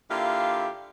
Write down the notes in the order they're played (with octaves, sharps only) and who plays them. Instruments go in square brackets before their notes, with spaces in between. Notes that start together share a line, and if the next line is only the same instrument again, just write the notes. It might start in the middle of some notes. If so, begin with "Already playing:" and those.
[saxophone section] D3 A#3 E4 F4 G4 F5